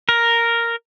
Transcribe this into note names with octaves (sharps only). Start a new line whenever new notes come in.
A#4